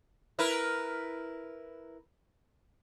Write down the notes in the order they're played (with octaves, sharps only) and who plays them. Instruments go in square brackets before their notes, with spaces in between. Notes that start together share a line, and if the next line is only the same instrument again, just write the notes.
[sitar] E4 A#4 B4